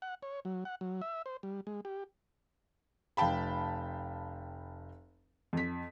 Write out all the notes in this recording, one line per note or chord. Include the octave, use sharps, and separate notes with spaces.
F#5
C#5
F#3
F#5
F#3
E5
C5
G3
G#3
G4
F1 F5 G5 A5 B5
F2 B6